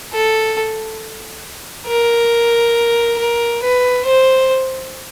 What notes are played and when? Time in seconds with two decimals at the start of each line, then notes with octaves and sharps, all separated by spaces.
0.13 A4
1.87 A#4
3.18 A#4
3.62 B4
4.05 C5